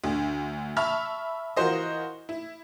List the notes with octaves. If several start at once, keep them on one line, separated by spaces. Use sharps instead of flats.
D2 D3
E5 A5 B5 C#6 F6
E3 F4 F#4 A#4 C5 D#5
E4